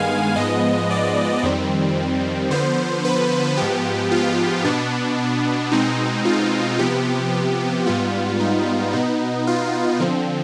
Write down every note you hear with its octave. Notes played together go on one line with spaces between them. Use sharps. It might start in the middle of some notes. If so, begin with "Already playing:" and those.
Already playing: G2 D#3 G#3 B3 F5 G#5
G#2 F3 G#3 B3 D#5
D5
F2 D#3 G3 C4
D3 F3 B3 C5
B4
G#2 F3 B3 G4
F4
B2 B3 D4
B2 G#3 C4 D#4
F4
C3 F3 B3 G4
G#2 G3 B3 F4
D#4
B2 B3 D#4
F4
D3 F3 C4